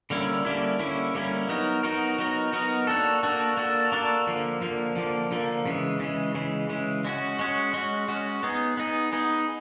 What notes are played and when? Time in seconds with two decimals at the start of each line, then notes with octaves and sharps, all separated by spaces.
0.10 D3 G3 A#3 C#4 E4
0.45 D3 G3 A#3 C#4 E4
0.79 D3 G3 A#3 C#4 E4
1.15 D3 G3 A#3 C#4 E4
1.49 F#3 B3 D#4 F#4 A#4
1.83 F#3 B3 D#4 F#4 A#4
2.19 F#3 B3 D#4 F#4 A#4
2.53 F#3 B3 D#4 F#4 A#4
2.87 A#3 D4 F#4 A4
3.23 A#3 D4 F#4 A4
3.57 A#3 D4 F#4 A4
3.92 A#3 D4 F#4 A4
4.27 D3 F3 A#3
4.61 D3 F3 A#3
4.96 D3 F3 A#3
5.31 D3 F3 A#3
5.66 C#3 E3 G#3
6.00 C#3 E3 G#3
6.35 C#3 E3 G#3
6.70 C#3 E3 G#3
7.05 G#3 C#4 F#4
7.39 G#3 C#4 F#4
7.74 G#3 C#4 F#4
8.08 G#3 C#4 F#4
8.43 B3 D#4 G#4
8.77 B3 D#4 G#4
9.13 B3 D#4 G#4